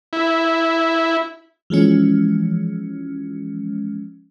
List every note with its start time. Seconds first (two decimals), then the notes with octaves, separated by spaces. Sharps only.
0.13 E4
1.70 E3 F3 G#3 C#4